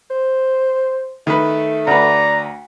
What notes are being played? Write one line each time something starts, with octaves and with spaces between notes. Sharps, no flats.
C5
D#3 A3 B4
D2 B4 D5 A#5